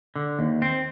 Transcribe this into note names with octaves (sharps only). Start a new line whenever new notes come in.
D3
D#2
C4